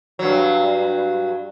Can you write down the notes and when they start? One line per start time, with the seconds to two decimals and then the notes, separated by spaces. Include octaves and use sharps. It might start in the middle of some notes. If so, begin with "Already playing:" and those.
0.19 G2 F#3